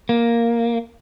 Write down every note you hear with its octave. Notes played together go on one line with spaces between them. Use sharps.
A#3